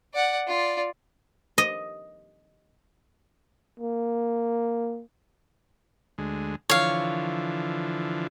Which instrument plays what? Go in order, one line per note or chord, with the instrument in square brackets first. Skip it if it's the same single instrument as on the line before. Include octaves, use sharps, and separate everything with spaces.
[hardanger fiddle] D5 F#5
F4 D5
[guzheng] D#5
[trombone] A#3
[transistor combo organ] D2 G#3
[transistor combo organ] D3 E3 F3 [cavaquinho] C#5 F5